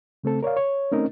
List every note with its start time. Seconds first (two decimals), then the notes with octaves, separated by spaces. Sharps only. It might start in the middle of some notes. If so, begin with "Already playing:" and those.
0.24 C#3 A3 C4 A4
0.43 A#4 C#5 D5 F5
0.57 C#5
0.92 A3 C4 C#4 D#4 A#4 D#5